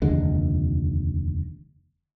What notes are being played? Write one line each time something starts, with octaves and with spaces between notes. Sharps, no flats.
F1 D#2 D3 G#3